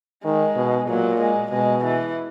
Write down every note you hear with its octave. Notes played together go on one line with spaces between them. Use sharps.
D#3 G#3
B2
A#2 F#3
G#3
B2 G#3
E3